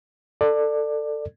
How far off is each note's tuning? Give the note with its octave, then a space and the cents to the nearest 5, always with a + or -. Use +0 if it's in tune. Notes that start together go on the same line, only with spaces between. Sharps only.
A4 +20 D5 +20